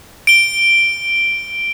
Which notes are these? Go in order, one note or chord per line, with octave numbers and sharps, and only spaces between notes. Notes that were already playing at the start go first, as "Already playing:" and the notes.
D7 G7